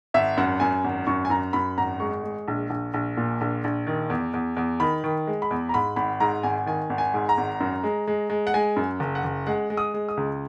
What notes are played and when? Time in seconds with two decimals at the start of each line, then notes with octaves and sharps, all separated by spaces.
0.14 G#1 E5
0.37 F#2 F#5
0.60 F#2 G#5
0.84 G#1
1.07 F#2 C#6
1.25 G#5
1.30 F#2 A#5
1.53 F#2 B5
1.77 G#1 A#5
2.00 G#3 C#6
2.23 G#3
2.48 A#1
2.70 A#1
2.94 A#1
3.17 A#2
3.41 A#1
3.64 A#1
3.87 D#3
4.10 E2
4.34 E2
4.57 E2
4.80 D#3 B5
5.04 D#3
5.27 G#3
5.42 B5
5.51 E2
5.69 A#5
5.74 G#2 B5
5.96 G#1 B5
6.20 G#2 A#5
6.43 G#1 G#5
6.66 D#3 G#5
6.90 G#1
6.98 G#5
7.14 G#2
7.29 A#5
7.38 G#1
7.60 F#2
7.84 G#3
8.08 G#3
8.30 G#3
8.47 F#5
8.54 G#3 G#5
8.76 F#2
9.00 F#1
9.15 F#5
9.24 F#1
9.47 G#3 F#5
9.70 G#3
9.77 D#6
9.94 G#3
10.09 D#6
10.17 C#2